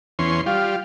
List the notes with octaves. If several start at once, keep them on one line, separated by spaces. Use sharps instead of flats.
E2 C#4 C6
G3 F4 F5